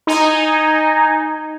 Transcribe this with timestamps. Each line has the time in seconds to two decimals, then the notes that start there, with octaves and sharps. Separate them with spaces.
0.07 D#4 G#5